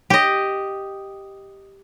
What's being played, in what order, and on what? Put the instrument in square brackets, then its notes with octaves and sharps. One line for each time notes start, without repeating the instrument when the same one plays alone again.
[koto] G4 D#5